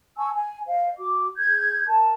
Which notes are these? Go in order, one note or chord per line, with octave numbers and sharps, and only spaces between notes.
G#5 A5 C#6 E6
G#5
C5 D#5 F5
F#4 D6
G#4 G6 G#6
A#4 A5